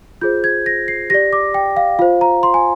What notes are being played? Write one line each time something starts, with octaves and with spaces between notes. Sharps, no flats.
F4 G#4 C5 G6
G#6
A#6
C7
G4 D5 A#6
D6
G5
F5
F4 C5 F5
A#5
C6
G#5